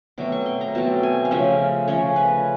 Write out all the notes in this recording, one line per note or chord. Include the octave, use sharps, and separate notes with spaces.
B2 F#3 A3 C4 D6
C#6
C6
A#5
B2 F#3 A3 C4 A5
G#5
F5
C#3 F3 A3 C#4 E5
C#3 F3 A3 C#4 C#5
B4